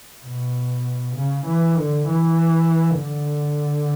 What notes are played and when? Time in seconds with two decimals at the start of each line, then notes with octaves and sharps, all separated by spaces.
0.24 B2
1.16 C#3
1.46 E3
1.77 D3
2.07 E3
2.99 D3